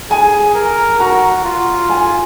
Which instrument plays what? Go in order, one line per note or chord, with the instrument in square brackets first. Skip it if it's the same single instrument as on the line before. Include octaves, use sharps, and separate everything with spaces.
[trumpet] G#4 [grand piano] G#5
[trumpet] A#4
[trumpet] F#4 [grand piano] A#5
[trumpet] F4
[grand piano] G#5